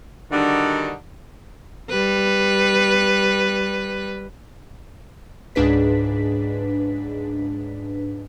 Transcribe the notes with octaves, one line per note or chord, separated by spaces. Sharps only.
D3 D#3 G3 D4 D#4 F#4
G3 B4
C#2 G#2 D4 G#4 B4 B6